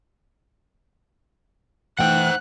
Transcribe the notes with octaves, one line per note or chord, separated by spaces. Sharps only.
E3 A3 C5 F#5 G5 F#6